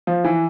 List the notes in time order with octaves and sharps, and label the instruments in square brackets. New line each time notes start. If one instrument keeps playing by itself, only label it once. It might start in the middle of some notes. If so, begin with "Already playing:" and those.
[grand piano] F3
E3